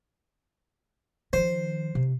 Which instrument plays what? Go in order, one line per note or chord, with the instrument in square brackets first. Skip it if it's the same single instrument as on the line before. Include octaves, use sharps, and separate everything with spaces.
[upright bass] D#3 F3 [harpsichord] C5
[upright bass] C3